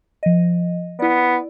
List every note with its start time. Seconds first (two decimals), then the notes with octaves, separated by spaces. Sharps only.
0.23 F3 D#5
0.99 B3 E4 D5